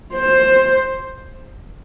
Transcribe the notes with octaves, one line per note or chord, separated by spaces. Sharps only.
C5